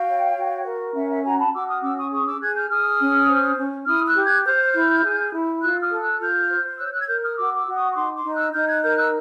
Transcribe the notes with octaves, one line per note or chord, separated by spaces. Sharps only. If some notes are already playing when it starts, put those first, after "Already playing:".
Already playing: F#4 F5 G5
C#5
F#4
A#4
C#4 E5 F#5
E5 F#5
F#4 G#5 A#5
A5 B5
F#4 D6 E6
D#6 F6
C#4 D6 E6
C#6 D#6
G#4 C#6 D#6
D6 E6
G#4 F#6 G#6
F6 G6
G#4 D#6 F6
C#4
C5
C#4
E4 D#6 F6
E6 F#6
G4
F#6 G#6
C5 F6 G6
E4
G#4
E4
F4 E6 F#6
D#6 F6
A4
E6 F#6
F4 F6 G6
C5
C#5 E6 F#6
G6
E6 F#6
G#6
A#4 F6 G6
D#6 F6
F#4 D6 E6
D6 E6
F#4
C#6 D#6
C#6
D#4 C6 D6
C6 D6
D#4
E6 F#6
D#4 F6 G6
F#6 G#6
A#4 F6 G6
E6 F#6